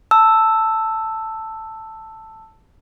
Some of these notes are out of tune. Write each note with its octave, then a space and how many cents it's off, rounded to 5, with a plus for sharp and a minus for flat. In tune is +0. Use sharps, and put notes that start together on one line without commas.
A5 +10 E6 +0